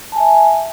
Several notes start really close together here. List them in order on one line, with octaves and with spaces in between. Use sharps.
A5 G#5 E5